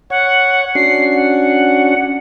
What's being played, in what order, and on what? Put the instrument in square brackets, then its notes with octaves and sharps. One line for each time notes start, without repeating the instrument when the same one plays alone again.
[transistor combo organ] C#5 [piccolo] F#5
[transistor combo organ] C#4 D4 F#4 [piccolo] C7
[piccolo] F#5